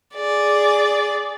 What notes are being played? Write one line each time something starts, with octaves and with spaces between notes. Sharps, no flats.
G#4 D5